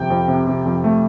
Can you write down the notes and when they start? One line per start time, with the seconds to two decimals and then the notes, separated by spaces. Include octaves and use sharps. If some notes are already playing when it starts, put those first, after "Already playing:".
Already playing: F2 C3 G5
0.10 F2
0.28 C3
0.47 C3
0.65 F2
0.84 A3